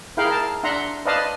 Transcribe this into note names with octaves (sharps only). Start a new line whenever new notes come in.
E4 G#4 A#4 F5 G5 B5
A#4 A5
D4 E5 F#5 A#5 C6
B4 C5 D5 D#5 F5 A5